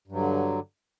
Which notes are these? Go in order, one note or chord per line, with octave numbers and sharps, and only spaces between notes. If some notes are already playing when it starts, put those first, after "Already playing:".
G2 D3 F#3